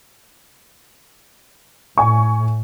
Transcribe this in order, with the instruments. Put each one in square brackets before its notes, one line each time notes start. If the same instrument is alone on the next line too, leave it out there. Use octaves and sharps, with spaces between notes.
[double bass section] A2 [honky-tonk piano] G#5 C#6